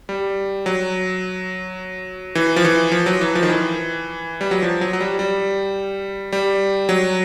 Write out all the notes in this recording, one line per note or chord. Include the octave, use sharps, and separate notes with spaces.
G3
F#3
E3
F3
E3
F3
F#3
E3
F3
D#3
E3
G3
F#3
F3
F#3
F#3
G3
G3
G3
F#3